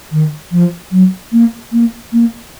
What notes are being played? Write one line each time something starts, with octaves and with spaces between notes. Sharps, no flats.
D#3
F3
F#3
A#3
A#3
A#3